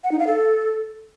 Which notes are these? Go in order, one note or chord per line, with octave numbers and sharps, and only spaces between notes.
F#5
D#4
F5
A4